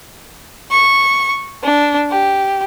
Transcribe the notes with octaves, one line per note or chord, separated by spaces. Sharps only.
C#6
D4
G4